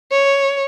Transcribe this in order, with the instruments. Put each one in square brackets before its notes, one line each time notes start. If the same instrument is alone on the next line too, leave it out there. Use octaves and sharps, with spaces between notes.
[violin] C#5